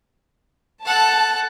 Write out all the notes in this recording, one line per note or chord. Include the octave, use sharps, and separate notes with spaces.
A4 F#5 A5